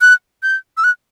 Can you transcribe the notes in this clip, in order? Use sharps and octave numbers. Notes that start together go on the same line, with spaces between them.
F#6
G6
E6
F#6